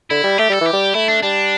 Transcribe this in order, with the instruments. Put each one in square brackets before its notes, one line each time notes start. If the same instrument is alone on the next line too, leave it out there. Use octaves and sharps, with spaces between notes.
[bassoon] D3 [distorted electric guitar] E4
[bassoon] G3
[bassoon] A3 [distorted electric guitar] G4
[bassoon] G3 [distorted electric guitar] A4
[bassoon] E3 [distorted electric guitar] G4
[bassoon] G3
[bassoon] A3 [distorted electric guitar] E4
[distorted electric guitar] D4
[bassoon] G3 [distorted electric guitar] D4